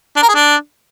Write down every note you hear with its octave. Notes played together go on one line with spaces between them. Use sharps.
D4
A#4
G#4
D4